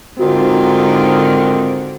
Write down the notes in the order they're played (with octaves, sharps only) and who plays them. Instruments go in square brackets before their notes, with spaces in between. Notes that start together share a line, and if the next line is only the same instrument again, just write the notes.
[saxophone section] G#2 D#3 F4 [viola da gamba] D3 [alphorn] C4 [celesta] F#4 C5